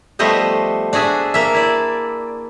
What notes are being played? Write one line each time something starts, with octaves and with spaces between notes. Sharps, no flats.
F3 G3 A3 B3 C5 D#5
D4 F#4 G#4 E5
A#3 E5
E4 D5